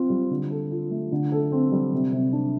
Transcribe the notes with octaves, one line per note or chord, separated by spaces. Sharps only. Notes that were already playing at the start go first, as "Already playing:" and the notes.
Already playing: C4 F4
G3
D3
A4
F4
A3
D3
A4
C4
G3
C3
C3
D4